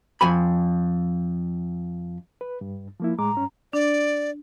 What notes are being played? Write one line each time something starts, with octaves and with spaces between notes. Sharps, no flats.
F2 G#5 B5
B4
G2
F3 A#3 E4
A2 G#3 A#5 D6
G2 C#4
D4 D5